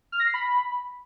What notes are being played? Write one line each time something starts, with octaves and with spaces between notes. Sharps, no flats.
F6
A#6
C7
B5